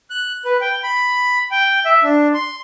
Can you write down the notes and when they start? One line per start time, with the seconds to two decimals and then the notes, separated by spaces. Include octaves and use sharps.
0.10 F#6
0.45 B4
0.61 G5
0.83 B5
1.51 G5
1.85 E5
2.04 D4
2.34 C6